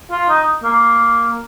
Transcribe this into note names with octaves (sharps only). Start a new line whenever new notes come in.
F4
D#4
A#3